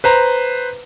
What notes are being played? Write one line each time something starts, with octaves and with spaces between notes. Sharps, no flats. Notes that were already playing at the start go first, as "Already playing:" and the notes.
B4 C5 A#5